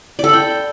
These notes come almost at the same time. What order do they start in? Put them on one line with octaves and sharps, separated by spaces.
D5 A4 B5 G5